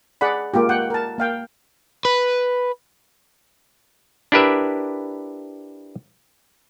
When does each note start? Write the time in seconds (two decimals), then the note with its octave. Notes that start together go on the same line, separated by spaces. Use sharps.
0.21 G#4 D5 F#5 B5
0.54 G#3 A#3 F4 G4
0.69 F#5 G5
0.90 A#4 A5
1.18 A#3 F5 G5
2.05 B4
4.32 D4 E4 G4 A#4 B4 E5